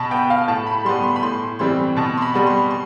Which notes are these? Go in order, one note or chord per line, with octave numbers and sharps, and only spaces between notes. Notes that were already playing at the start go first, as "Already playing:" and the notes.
Already playing: B2 A5 B5
B3 G5
F5
A2 A5
B5
G3 B3 C6
C6
B5
A2 C6
E3 G3 C4 C6
B2 A5
C6
B5
G3 B3
C6
C6